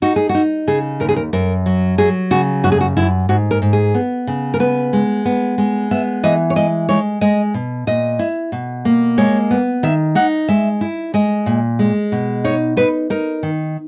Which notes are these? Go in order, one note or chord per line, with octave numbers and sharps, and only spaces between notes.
D#4 F#4
G#4
F#4
D#4
C#3 G#4
D#2 A#4
G#4
A#4
F#2 A#4
F#3
F#3 G#4
C#3 F#4
F#2 F#4
G#4
F#4
F#2 E4
G#2 F#4
A#4
G#2
G#4
B3
C#3
A#4
B3 B4
G#3
B3
G#3
B3 E5
E3 D#5
C#5
G#3 D#5
G#3 C#5
G#3 D#5
B2
A#2 D#5
E4
B2
A#3
G#3 C#5
B3
D#3 E5
D#4 F#5
G#3 E5
E4
G#3 D#5
A#2
G#3
B2
D#4 C#5
D#4 B4
D#4 A#4
D#3